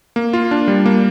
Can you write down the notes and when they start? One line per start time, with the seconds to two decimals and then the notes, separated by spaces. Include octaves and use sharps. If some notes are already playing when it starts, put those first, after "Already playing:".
0.16 A#3
0.33 F4
0.51 D4
0.68 G3
0.86 A#3